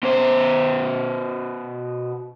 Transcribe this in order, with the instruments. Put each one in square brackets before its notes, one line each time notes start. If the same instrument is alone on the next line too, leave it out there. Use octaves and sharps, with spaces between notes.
[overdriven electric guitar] B2 C5